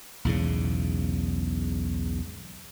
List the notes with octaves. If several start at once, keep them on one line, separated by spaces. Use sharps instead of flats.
B1 E2 G#2 C#3